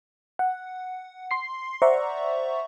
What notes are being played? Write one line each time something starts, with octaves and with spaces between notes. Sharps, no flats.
F#5
C6 C7
C5 D5 E5 F#5 A#5 C#6